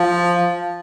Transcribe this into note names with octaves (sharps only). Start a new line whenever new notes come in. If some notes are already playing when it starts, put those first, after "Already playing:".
Already playing: F3